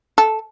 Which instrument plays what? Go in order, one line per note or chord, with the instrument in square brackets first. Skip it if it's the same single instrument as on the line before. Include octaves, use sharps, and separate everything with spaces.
[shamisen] A4